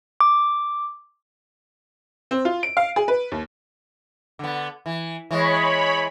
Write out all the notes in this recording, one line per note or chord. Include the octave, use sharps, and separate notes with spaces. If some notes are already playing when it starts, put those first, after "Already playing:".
D6
C4
F4
D7
F5
G#4
B4
D#2
D3 B3
E3
E3 G#3 C#5 B5